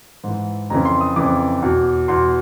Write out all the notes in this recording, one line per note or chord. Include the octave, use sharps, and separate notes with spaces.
G#2 E3
F2 C#3 E3 A#5
C6
D#6
F2 C#3 E3 D6
E2 B2
E2 B2 C6